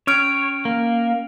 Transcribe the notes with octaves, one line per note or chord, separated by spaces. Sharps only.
C#4 C#5 F6 D7
A#3